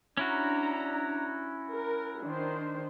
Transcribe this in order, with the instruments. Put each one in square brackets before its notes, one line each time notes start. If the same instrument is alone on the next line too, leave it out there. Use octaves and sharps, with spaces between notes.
[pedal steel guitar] C#4 E4 F#4 [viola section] D4 A#5
[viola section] A#4
D#3 D4 C5